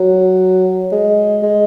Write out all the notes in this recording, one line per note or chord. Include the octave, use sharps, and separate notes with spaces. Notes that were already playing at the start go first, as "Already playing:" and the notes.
Already playing: F#3
G#3
G#3